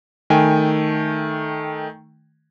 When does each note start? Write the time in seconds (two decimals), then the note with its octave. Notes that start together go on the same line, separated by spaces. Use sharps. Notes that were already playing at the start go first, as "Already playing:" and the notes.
0.30 D#3 A3 G5 G#5